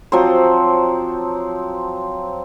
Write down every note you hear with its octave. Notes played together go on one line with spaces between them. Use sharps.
F3 F#3 C4 C5